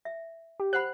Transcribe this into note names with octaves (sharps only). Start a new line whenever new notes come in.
E5
G4
C5 F#5 B5 F#6